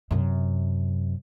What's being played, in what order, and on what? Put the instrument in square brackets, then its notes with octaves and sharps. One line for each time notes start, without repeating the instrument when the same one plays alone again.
[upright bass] F#2 C3